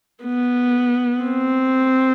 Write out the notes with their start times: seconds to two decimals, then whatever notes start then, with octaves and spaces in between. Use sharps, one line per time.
0.24 B3
1.23 C4